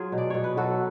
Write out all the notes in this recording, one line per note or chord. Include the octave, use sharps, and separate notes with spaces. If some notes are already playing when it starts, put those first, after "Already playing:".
Already playing: F#3 F4 G#4
B2
D5
B2 C#5
B4
F#3 F#4 A4